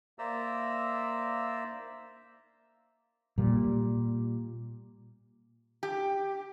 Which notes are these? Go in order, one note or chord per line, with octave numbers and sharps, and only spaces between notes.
A#3 C5 D5 E5 A#5 E6
A#2 G3
G4